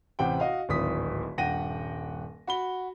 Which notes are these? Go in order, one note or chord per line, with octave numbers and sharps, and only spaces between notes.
A1 C3 F#5 G5
F#4 D#5 F5
D1 G#1 D#6 B6
D#1 G2 F#5 G5 A#6 D#7
F#4 B5 G7